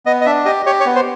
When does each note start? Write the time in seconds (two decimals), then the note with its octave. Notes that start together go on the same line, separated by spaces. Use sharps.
0.06 B3 D#5
0.21 D#5
0.25 D4 E5
0.45 G4 D#5
0.66 G4 C#5
0.80 C#5
0.86 B3
0.96 C5